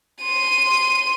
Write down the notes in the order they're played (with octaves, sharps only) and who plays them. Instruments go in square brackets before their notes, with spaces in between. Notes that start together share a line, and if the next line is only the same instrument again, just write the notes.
[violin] C6 D#7